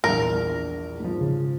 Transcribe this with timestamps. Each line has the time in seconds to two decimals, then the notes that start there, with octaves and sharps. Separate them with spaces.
0.04 A#1 E2 A#4
1.00 G#2 F3
1.21 C#3